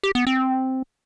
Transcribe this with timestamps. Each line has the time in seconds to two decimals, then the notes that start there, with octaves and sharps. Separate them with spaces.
0.03 G4
0.15 B3
0.27 C4